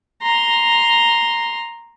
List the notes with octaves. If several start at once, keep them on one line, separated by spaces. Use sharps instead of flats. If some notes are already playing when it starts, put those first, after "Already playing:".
A#5 C6